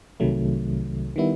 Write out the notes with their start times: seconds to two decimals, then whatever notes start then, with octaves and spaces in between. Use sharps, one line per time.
0.20 C2 C3 D#3 F#3 A3
1.16 D#3 G3 B3 E4